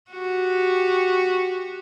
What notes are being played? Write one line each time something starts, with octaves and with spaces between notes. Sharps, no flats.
F#4 G4